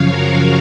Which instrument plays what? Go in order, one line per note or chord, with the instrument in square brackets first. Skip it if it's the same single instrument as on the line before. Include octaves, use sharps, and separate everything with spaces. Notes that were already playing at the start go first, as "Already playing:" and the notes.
Already playing: [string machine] F#2 C#3 F3 C#5 F5
F#4 A#4